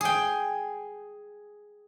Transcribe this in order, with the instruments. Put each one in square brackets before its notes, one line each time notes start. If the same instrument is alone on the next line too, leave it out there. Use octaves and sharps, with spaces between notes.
[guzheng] G#4 G5